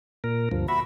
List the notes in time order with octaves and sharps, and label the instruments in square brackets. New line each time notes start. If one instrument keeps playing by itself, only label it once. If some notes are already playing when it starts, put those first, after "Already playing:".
[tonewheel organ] A#2 A#4
D2 G2 F3
[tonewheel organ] F#4 E5 [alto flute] B5